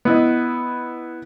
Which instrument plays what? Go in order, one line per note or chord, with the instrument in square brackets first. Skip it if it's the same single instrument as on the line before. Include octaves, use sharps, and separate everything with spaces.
[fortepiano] B3 E4 D#5